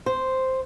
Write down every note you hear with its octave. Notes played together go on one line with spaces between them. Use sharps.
C5